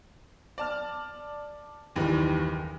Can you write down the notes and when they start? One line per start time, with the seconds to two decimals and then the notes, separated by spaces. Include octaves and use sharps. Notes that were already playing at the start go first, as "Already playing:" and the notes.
0.58 D5 A5 F6
1.96 F#1 D#2 D#3 E3 G3 B4